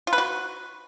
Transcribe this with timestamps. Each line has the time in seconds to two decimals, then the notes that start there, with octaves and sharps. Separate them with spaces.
0.07 F4
0.13 B4
0.18 F#4